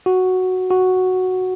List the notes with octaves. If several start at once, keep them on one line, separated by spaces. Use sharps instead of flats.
F#4
F#4